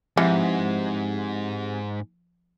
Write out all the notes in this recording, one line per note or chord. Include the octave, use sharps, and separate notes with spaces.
G#2 E3 F3 C4 G4 F#5